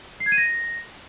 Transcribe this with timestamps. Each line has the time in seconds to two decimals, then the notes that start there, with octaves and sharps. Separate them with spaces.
0.20 C7
0.26 G#6
0.32 D#7
0.38 A#6